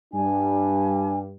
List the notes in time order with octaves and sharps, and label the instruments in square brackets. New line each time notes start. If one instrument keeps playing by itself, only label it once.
[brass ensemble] G2 G3 [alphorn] D4 [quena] G#5